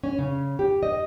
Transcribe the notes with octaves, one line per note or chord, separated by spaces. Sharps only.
C#4
C#3
G4
D#5